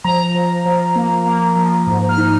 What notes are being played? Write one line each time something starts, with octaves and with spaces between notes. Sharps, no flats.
F3 A#5
F3
F3
A#3
A#3
F3
G#2
F6
D#4